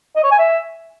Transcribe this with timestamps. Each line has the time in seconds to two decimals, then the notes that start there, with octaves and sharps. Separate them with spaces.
0.16 D#5
0.23 C#5
0.31 G#5
0.39 E5